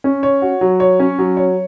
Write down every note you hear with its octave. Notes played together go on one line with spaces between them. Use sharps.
C#4
C#5
F#4
F#3
C#5
C#4
F#3
C#5